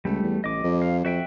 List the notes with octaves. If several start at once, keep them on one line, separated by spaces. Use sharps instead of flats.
C#2 G3 A3
E2
A1 D#5 D6
F2
F5
F2 F#4 E5 G5